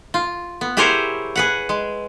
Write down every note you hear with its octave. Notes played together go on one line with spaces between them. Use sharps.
F4
B3
E4 G4 G#4 A#4 C5 C#5
G#4 B4 F#5
G#3